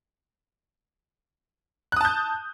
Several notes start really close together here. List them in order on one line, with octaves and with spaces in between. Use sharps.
F#6 D#6 A5 G6